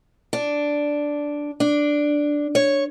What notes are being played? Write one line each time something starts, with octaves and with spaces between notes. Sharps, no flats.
D4
D4
C#5